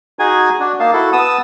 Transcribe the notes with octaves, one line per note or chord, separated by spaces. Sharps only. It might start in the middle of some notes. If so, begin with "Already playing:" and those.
D#4 F#4 G#4 G#5
D4 F#4
A#3 D#4 F5 A5
E4 F#4 A4
B3 A5 D#6 E6